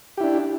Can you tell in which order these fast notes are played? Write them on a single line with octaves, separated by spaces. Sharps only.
G4 E4 D4